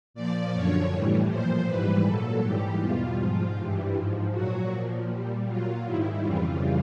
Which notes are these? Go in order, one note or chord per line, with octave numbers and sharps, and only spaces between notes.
A#2 F3 D5
F#2 D3 F3 C#5
A2 E3 G3
A#2 F3 C5
G#2 E3 G3 B4
A#2 F#3 A4
G#2 E3 G3 G4
E2 B2 G3 F4
G#2 F3 F4
G2 E3 G3
G#2 F3
A#2 F#3 F#4
A#2 F3
A#2 G3
A#2 F#3 F4
G#2 D#3 G3 E4
F2 C#3 E3 G3 F4